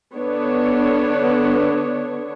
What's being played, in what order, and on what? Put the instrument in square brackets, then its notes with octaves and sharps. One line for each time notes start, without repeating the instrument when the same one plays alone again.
[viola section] D3 B3 D4 C#5